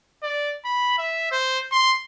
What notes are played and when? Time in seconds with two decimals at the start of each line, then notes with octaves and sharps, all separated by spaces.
0.23 D5
0.65 B5
0.98 E5
1.32 C5
1.72 C6